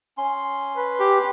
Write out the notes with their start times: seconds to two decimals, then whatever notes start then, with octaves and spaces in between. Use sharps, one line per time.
0.18 C#4 C6
0.76 B4
1.00 G4